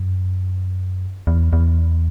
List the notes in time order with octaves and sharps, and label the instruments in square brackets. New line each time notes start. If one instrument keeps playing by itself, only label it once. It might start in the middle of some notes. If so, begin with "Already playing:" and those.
Already playing: [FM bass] F#2
E2
E2